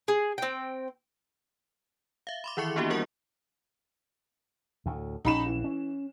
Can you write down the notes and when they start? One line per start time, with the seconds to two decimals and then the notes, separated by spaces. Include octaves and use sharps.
0.08 G#4
0.38 C4 G5
2.27 E5 F5
2.44 B5 C6 D6
2.57 D#3 E3 E4 E5 C#6 C#7
2.76 A#3 B3 D4 E4 F#4 G4
2.90 G3 A#3 F#4 A#4 F#5 C#6
4.86 D2 A2
5.25 A#1 C#4 D#4 B5 E7
5.46 E3
5.64 C#4